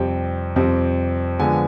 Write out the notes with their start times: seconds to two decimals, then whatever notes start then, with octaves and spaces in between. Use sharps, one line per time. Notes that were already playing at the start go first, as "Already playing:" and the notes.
Already playing: F2 C3 G3 C4 G5
0.56 F2 C3 G3 C4
1.39 D3 F3 G#3 B3 G#5